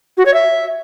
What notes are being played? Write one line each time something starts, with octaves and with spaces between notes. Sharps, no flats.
F#4
C#5
E5